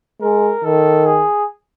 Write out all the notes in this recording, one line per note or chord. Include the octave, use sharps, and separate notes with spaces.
G#3 A#4
D#3 A4
G#4